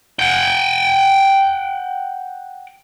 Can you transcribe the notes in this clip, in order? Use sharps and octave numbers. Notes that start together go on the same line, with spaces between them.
F#5 G5